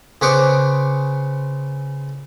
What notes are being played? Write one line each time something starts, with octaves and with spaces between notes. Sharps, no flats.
C#3 G#4 B4 C5 C#6 D6